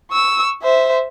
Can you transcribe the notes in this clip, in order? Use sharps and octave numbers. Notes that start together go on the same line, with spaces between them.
C#6 E6
C5 E5